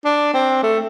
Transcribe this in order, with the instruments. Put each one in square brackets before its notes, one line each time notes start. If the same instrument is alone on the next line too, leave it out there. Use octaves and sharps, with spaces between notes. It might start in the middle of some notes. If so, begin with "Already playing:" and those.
[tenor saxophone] D4
C4
A3